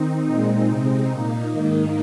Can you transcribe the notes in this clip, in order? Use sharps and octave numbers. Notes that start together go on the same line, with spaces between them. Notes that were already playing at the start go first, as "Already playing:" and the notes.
Already playing: D#3 C4 D#4
A#2 G#3 C4 D#4
C3 G#3 C4 D#4
A#2 A#3 D#4
G#2 D#3 A#3 D#4